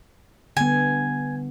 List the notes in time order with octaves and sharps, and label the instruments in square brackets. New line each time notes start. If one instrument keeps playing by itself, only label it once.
[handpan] D3 G3 B3 [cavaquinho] G#5